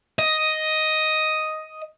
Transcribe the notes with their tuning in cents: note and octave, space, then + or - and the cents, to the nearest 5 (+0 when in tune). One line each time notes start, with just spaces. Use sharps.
D#5 +5